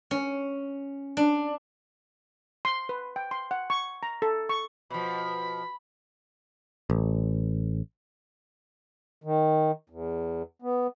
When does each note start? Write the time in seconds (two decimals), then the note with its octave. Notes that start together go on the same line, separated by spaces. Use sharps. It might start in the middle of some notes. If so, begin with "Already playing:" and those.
0.11 C#4
1.17 D4
2.65 C6
2.89 B4
3.16 G5
3.31 C6
3.51 F#5
3.70 C#6
4.03 A#5
4.22 A4
4.49 C#6
4.90 B2 F3 B5
6.90 A1
9.24 D#3
9.90 E2
10.62 B3